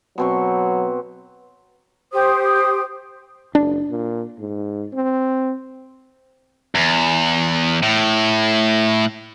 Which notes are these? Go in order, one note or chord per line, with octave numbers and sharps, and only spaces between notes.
B2 F#3 C4 C#6
G4 C5 D#6
F#1 D4
A#2
G#2
C4
E2
A2